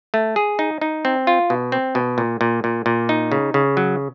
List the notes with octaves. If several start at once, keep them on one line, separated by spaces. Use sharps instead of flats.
A3
G#4
D#4
D#4
C4
F4
B2
C4
B2
A#2
A#2
A#2
A#2
D#4
C#3
C#3
F#3